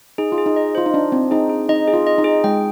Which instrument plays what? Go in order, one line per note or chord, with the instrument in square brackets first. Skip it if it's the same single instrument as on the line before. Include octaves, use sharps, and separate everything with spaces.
[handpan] D#4 [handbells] G#4
[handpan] F4
[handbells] G#4
[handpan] D#4
[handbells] D#5
[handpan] F4 [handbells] C5
[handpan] D#4
[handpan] D4 [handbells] D#5
[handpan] C4 [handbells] D4
[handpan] D#4 [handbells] G#4
[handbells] G#4
[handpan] D#4 [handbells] D#5
[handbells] G#4
[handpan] F4
[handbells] D#5
[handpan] D#4
[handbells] G#4
[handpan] G#3 [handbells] G5